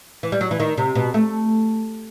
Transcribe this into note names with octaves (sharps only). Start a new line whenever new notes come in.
E3
G3
F#3
E3
D#3
C3
B2
A3